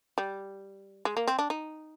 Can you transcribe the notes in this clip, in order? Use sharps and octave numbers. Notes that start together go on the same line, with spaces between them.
G3
G#3
A#3
C4
D4
D#4